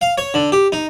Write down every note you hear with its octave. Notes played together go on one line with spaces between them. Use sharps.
F5
C#5
D3
G4
D#4